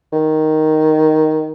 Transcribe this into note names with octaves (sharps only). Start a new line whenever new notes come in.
D#3